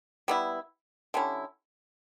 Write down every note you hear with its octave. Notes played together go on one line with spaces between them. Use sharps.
G3 B3 E4
D3 G3 C#4 E4